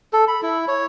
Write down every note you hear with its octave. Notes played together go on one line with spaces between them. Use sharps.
A4
B5
E4
C#5